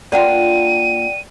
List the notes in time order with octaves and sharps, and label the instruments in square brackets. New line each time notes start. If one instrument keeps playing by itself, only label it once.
[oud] A#3 D4 F4 [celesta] D5 F#5 G5 [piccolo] D#7